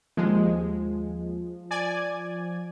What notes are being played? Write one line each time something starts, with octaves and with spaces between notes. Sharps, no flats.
D#2 F3 G#3
D5 G#5 G#6